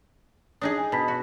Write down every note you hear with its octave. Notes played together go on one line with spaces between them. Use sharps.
D4 D#4 G#4 D#6
G#5
B2 A5 B5 B6
F#4